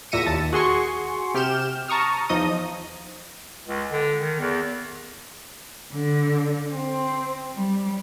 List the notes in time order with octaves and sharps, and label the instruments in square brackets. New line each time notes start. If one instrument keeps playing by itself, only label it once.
[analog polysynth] E2 A#2 E5 A#6 C#7 D#7
D#2 A5
F#4 G#4 C6 C#6
C3 G4 F6 G6 E7
A5 A#5 C#6 D#6 F6
E2 F3 D#4 D#5 D#6
[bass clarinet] C#2
D3
D#3
E2
[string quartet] D3
C4
G3